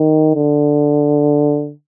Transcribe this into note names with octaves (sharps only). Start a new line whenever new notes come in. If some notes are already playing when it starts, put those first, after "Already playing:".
Already playing: D#3
D3